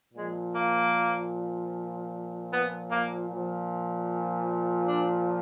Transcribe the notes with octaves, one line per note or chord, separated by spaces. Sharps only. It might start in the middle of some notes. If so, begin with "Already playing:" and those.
A#2 F3 G#3
A#3
B3
A#3
A#2 F3
D4